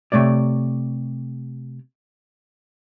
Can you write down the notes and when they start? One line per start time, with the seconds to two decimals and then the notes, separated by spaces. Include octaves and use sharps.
0.12 C3 E3 A3 C#5 D5